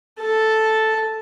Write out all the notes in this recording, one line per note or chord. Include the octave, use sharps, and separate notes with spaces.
A4 A5